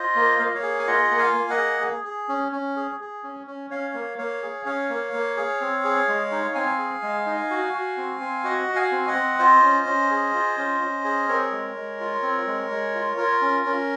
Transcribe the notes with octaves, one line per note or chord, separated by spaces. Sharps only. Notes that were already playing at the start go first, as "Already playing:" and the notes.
Already playing: F4 C5 D#5
A#3
A#3 F5
D#5
C#5 F5
G#4
G#5
F4 D#5 F#5
A#3
F5 G#5
A#3
D#5 F#5
G#4
G#4
G#4
C#4
C#4
G#4
G#4
C#4
C#4
C#4 C#5 F5
A#3
A#3 C#5 F5
G#4
C#4 C#5 F5
A#3
A#3
G#4
C4
G#4
G#3
D#4
C4 F5 G#5
G#4
G#3
D#4
F#4
F#4
C4
C4
F#4 D#5 F#5
F#4
F5 G#5
C4
D#5 F#5
C4
F4 C5 D#5
C#4
C#4
G#4
F4
C#4
C#4
G#4
C4 A#4 C#5
G#3
G#3
F4
C4
G#3
G#3
F4
F4 A#4
C#4
C#4